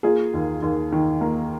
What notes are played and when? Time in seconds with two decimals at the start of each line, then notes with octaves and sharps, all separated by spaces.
0.03 A#3 F4 G#4
0.34 D#2
0.62 D#2
0.92 D#3
1.21 A#3